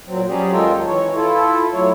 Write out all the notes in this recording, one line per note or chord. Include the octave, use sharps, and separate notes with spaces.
A#2 F#3 C4
F#3 G3 C#4 G4 G#4
D#2 G#3 F4 A4 A#4 G5
E3 C#5
E4 F4 A4
F#3 A3 E4 C#5